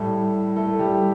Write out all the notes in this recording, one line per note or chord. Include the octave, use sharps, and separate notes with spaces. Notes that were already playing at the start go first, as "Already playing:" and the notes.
Already playing: A2 G3 A3 A4
A3 A4
A4
G3 G4